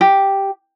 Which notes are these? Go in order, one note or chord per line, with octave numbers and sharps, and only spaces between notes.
G4